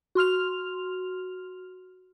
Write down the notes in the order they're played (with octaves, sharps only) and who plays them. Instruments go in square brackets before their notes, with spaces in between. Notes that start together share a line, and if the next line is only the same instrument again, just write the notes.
[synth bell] F#4 C6 F6 F7